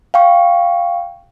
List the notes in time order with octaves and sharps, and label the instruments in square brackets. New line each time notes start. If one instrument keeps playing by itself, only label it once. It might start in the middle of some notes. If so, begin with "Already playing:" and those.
[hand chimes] F5 G5 C#6